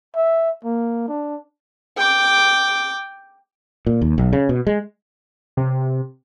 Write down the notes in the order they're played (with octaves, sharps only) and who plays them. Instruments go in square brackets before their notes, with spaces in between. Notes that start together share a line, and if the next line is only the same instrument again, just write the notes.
[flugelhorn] E5
A#3
D4
[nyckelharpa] G5 D6
[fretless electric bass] A#2
D#2
B1
C#3
B2
G#3
[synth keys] C3